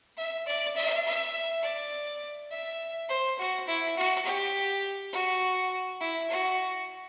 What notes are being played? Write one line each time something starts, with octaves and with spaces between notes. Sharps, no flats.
E5
D5
E5
E5
D5
E5
C5
F#4
E4
F#4
G4
F#4
E4
F#4